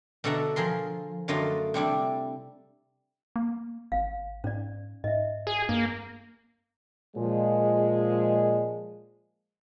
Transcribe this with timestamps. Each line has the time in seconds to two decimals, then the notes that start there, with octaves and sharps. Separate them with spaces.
0.24 B2 D3 A4 E5 F#5 A#5
0.56 F3 G#4 A#4 C6
1.28 F#2 D3 A3 F4 D#5 F5
1.74 C3 G3 D4 E4
3.36 A#3
3.92 G#1 F5
4.44 G#2 C#4 D5
5.04 G#2 D#5 E5
5.47 G#4
5.69 G2 A#3
7.17 A#2 F3 G#3